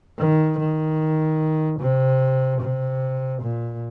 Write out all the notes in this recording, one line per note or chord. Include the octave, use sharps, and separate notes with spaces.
D#3
D#3
C3
C3
A#2